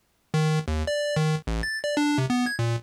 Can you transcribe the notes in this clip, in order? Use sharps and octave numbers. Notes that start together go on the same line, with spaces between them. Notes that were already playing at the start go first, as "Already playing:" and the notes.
D#3
D#2
D5
D#3
A1
A6
D5
D4
C3
B3
G#6
A#2